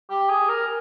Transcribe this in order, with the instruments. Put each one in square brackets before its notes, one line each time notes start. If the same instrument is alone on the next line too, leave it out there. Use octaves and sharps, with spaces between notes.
[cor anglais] G4
G#4
A#4